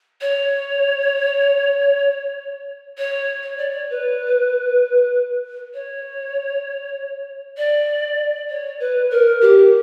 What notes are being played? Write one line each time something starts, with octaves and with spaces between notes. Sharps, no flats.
C#5
C#5
C#5
D5
C#5
B4
C#5
D5
C#5
B4
A#4
G4